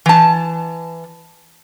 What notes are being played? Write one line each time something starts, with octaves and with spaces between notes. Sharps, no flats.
E3 A5